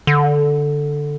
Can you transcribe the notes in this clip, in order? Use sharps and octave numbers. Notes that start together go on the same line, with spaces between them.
D3